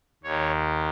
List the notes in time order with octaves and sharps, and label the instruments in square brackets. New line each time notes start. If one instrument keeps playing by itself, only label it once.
[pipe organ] D#2 D#3 C#5